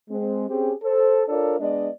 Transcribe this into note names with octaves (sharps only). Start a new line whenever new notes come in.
G#3 C4
C4 C#4 G4 G#4
A4 C5
D4 F4 A4 A#4 C#5 D5
G#3 B3 D4 D5 D#5